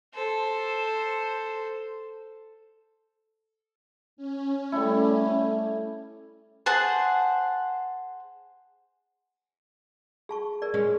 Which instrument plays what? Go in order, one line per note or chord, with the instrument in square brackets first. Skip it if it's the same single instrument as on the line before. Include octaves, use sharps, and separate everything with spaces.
[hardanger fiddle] A4 C5
[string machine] C#4
[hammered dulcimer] G3 E4 [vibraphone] A3 A4
[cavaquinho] G#4 C5 F#5 A5
[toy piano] G#4 A5 C#6
G#4 A#4 D5
[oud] G#3 C#4